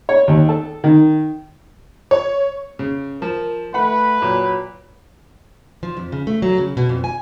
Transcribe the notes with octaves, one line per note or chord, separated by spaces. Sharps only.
C#5
D#2
A4
D#3
C#5
C#3
F3 A#4
A3 B4 F#5 B5
A#2 F#3
F3
F2
C#3
A3
F#3
C#3
B2
F2
G#5